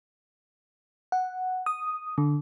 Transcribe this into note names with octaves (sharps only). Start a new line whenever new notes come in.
F#5
D#6
D3